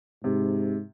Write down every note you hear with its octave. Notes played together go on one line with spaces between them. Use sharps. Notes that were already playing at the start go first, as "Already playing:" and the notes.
G#2 C3